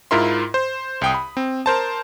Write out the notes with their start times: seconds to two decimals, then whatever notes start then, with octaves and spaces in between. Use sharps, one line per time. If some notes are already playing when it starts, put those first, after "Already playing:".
0.11 G#2 E4 F4 A#4 E5 C6
0.54 C5
1.01 C2 G5 D#6
1.14 B5
1.37 C4
1.66 A#4 C5 A5